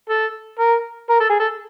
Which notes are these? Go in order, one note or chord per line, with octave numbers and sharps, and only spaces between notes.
A4
A#4
A#4
A4
G#4
A4